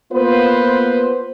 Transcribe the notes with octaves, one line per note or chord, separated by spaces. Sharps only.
A#3 B3 F4 B4 C5